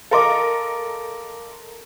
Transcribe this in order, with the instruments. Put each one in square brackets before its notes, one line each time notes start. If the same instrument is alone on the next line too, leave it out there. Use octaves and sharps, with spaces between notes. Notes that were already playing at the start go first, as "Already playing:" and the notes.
[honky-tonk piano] A4 A#4 D#5 [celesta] F5 C6 D6